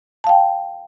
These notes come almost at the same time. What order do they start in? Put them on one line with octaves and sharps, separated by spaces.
A5 F5 G5